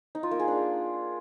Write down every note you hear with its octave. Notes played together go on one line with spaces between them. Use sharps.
D#4
F4
A#3
G#4
D4